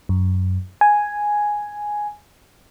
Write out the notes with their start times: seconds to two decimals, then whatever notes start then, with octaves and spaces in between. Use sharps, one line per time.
0.09 F#2
0.81 G#5